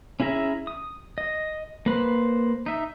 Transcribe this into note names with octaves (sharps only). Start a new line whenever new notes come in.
C#4 E4 G#4 E5 A#5
D#6
D#5
A#3 B4 C5
D#4 E5